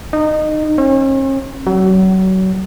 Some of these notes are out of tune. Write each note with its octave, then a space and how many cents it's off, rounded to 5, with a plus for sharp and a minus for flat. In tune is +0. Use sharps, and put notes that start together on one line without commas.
D#4 -20
C#4 -45
F#3 +30